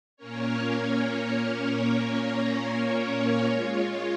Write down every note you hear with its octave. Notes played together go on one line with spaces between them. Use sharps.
A#2 A#3 C#4 A#4 C#5
G#3 F4 C#5